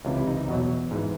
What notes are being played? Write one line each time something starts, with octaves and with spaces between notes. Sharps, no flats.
C#2 C3 E3 F4
E4
D#4
D#4
E2 B2 F#3
G#2 E3